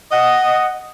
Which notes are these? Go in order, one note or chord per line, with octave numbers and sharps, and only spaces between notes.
D#5 F#5